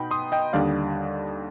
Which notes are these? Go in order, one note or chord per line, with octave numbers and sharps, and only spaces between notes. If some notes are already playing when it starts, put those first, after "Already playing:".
Already playing: B2 B3 D#4 G5 B5
C6 D#6
D#5 G5
D#2 D3 G3 D4 D5 F5